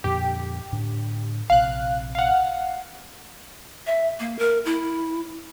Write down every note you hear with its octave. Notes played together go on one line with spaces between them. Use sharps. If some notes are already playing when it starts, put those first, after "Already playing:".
F2 A#2 D3 G4
A2 D3 D4
A#1 C3 F5 F#6
F5 F#5
E5
A#3
A#4
E4